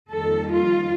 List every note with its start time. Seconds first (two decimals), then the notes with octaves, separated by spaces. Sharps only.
0.11 F2 D#3 G3 A#3 A4
0.51 F4